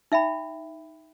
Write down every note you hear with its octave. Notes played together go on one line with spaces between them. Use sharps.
D#4 E5 G5 B5